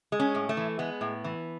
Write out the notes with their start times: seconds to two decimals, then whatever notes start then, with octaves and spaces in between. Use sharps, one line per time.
0.12 G#3
0.20 C#4
0.35 A2
0.49 A3
0.57 E3
0.79 G#3 B3
1.01 A2
1.24 E3